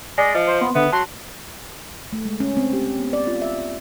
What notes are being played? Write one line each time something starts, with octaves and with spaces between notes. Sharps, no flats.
G#3 D5 G#5 A#6
F3 D#5
C5
B3 C6
D3 B3 E5
F#3 A5 C6
A3
G#3
C#4
C4
G4
B3
D5
F4
E5